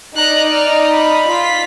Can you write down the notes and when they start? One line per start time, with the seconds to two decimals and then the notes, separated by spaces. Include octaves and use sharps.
0.16 D#4 D5 D#5 A#5 F#6
0.51 F6
0.92 B5
1.27 F4 B6